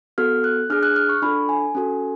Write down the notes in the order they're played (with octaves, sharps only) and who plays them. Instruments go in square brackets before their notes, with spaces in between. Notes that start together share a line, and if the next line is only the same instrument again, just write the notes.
[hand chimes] B3 F#4 A4 F6
F#6
D4 G#4 F6
F#6
F6
C#6
D4 F4 A4 B5
G#5
C#4 F#4 A4